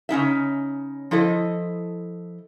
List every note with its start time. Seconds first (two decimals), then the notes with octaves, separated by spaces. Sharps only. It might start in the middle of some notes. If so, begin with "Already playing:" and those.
0.09 C#3 C#4 D#4 E5
1.11 F3 E4 A4 D#5